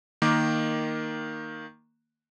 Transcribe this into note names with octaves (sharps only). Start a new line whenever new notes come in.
D#3 A#3 D6